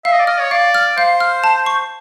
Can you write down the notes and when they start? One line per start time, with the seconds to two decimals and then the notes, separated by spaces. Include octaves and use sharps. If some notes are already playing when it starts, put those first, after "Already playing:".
0.05 E5 F5
0.12 D#5
0.19 D5
0.26 D#5 F6
0.40 C#5
0.51 D5 F5
0.74 F6
0.97 C5 F5
1.20 F6
1.44 A5
1.66 C#6